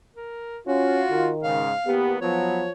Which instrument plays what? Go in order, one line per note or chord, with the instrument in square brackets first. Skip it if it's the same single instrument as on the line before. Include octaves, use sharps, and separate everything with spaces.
[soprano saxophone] A#4
[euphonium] C#4 [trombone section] F4 [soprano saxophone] F#4
[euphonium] D#3
[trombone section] G#2 C#3 [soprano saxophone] F5
[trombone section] E2 A#3 B3 [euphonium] G4
[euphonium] F3 [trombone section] F#3 B3 [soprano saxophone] C#5